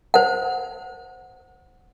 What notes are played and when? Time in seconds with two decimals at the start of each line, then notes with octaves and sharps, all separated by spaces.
0.14 C5 F#5